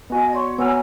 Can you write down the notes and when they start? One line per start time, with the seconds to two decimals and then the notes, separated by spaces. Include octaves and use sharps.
0.10 B3 F#4 D#5 G#5
0.33 C#5 D5 C6 C#6
0.58 B3 F#4 C#5 G#5 A#5 E6 F6